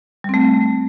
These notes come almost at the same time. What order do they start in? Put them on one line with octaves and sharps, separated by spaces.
G3 C4 A3